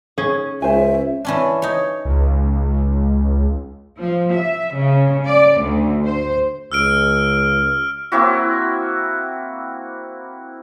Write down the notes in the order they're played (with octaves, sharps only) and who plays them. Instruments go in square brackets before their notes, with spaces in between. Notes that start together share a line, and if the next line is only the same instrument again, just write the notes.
[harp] C#4 [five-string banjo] G#4
[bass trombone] C#2 [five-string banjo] C5 G#5 [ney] E5
[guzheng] E3 C#4 D4
D#4 C#5
[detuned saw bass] C#2
[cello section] F3
E5
C#3
D5
D2
C5
[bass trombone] C#2 [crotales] E6 F6 D7
[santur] A#3 C4 E4 F#4